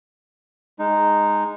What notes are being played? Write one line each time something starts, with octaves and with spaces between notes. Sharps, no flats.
G#3 D#4